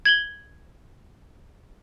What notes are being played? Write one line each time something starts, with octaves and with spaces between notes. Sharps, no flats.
G#6 F#7 G7